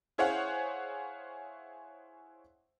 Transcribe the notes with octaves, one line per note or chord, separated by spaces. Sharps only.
E4 G#4 C5 C#5 F5 F#5